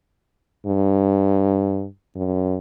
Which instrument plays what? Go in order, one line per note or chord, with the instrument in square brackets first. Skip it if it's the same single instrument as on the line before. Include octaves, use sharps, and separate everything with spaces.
[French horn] G2
F#2